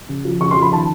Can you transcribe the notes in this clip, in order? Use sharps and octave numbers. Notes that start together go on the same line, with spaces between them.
C#3
F3
C#3 C#6
C6
F3
B5
D#3 A5